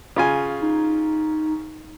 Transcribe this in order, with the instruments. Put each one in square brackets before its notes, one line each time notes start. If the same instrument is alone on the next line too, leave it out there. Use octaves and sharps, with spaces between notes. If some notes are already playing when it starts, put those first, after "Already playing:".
[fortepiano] C#3 F4 G#5
[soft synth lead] D#4